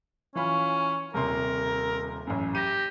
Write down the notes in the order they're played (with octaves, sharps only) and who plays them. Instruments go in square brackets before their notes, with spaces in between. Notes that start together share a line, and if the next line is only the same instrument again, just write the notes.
[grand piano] E3 F4 B5 [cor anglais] C#4
[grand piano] D#1 C3 C6 [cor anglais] A#4
[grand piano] A1 F#2
[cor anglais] G4 [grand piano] A#6 D#7